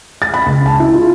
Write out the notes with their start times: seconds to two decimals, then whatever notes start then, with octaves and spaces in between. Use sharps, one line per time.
0.22 A6
0.34 B5
0.46 C#2
0.66 A5
0.80 E4
0.94 F4